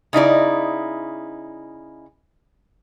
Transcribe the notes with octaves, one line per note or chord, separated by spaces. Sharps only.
C#3 D#4 E4 D5